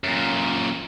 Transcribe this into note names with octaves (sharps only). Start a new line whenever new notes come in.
F#2 A#2